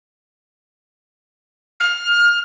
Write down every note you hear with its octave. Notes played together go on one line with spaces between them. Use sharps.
F6